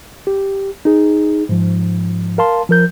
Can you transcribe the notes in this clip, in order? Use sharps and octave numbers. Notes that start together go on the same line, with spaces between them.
G4
D#4 G#4
G#2 F3
A#4 F5 A5 C6
F3 A#4 G6